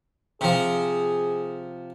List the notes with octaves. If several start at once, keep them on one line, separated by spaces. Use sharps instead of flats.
C3 F3 G#4